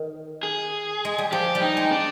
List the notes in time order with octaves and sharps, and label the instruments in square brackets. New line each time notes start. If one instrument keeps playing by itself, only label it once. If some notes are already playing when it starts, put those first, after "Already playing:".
Already playing: [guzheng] D#3
[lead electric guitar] G#4
[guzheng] G#3
G3
[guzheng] F3 [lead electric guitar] G4
[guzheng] G3
[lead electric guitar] D#4
[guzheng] G#3
[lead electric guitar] D4